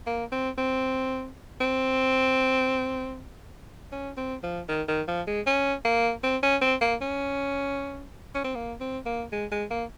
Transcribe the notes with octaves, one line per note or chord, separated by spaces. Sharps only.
A#3
C4
C4
C4
C#4
C4
F3
D#3
D#3
F3
G#3
C#4
A#3
C4
C#4
C4
A#3
C#4
C#4
C4
A#3
C4
A#3
G#3
G#3
A#3